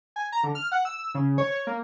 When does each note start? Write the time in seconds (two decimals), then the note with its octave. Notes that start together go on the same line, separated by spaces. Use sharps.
0.16 G#5
0.32 A#5
0.44 D3
0.55 F6
0.72 F#5
0.85 E6
1.15 C#3
1.38 C#5
1.51 C#5
1.67 A#3